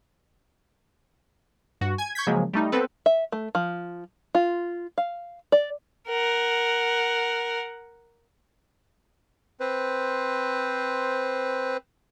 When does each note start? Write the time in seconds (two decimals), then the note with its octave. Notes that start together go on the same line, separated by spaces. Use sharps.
1.81 G2 F#4
1.98 G#5 G#6
2.15 C#6 G6 G#6 B6
2.27 C#3 F3 F#3 G#3 A#3
2.53 G3 A3 D#4
2.72 B3 C4 A4 B4
3.06 E5
3.32 A3
3.55 F3
4.35 F4
4.98 F5
5.52 D5
6.09 A#4 F#5
9.60 C4 B4 C5